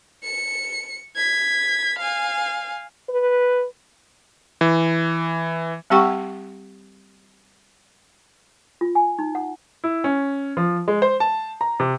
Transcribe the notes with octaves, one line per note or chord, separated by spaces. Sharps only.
C#7
G#6 B6
F5 G#5
B4
E3
G3 C4 G4 F#5 G5 C#6
F4
G#5
D#4
F#5
E4
C#4
F3
G#3
C5
A5
A#5
C3